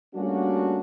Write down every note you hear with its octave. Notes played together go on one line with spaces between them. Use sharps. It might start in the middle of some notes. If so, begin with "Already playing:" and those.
G3 A3 A#3 C#4 D4 F#4